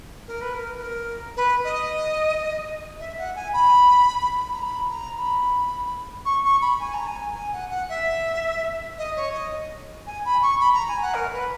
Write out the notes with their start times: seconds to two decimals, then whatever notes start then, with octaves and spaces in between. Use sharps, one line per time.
0.27 A#4
0.41 B4
0.54 A#4
0.75 B4
0.82 A#4
1.36 B4
1.64 D#5
3.00 E5
3.18 F#5
3.35 G#5
3.53 B5
4.53 A#5
4.63 B5
4.90 A#5
5.17 B5
6.25 C#6
6.44 C#6
6.61 B5
6.79 G#5
6.94 A#5
7.07 G#5
7.35 G#5
7.52 F#5
7.70 F#5
7.89 E5
8.98 D#5
9.16 C#5
9.33 D#5
10.06 G#5
10.25 B5
10.42 C#6
10.60 B5
10.74 A#5
10.88 G#5
11.02 F#5
11.14 A#4
11.33 B4